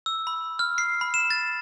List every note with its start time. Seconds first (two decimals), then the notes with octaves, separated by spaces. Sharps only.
0.06 E6
0.27 B5
0.59 F6
0.78 C7
1.01 B5
1.14 E7
1.30 A6